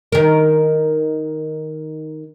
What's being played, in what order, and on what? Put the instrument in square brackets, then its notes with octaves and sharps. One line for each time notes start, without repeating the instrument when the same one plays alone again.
[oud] D#3 A#4